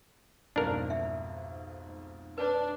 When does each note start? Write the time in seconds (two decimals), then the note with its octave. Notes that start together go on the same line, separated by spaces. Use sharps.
0.56 B1 F2 G#2 D4 A#4
0.90 E5
2.38 D4 B4 C#5